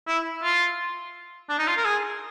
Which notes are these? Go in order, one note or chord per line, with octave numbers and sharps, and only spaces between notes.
E4
F4
D4
D#4
F4
A#4
G#4